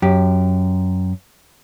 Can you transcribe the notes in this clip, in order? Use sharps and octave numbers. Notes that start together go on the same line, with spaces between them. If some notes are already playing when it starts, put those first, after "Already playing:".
F#2 G4